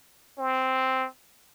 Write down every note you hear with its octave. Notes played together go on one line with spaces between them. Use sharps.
C4